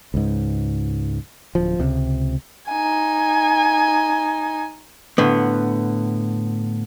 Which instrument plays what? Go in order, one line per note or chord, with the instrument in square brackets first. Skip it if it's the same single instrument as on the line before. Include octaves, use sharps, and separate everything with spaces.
[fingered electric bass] C#2 G#2
D1 F3
C#2 C3
[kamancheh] D#4 G#5
[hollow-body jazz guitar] A2 D3 B3